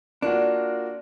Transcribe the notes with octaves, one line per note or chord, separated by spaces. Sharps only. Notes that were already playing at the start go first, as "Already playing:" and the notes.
A#3 D4 F4 F#4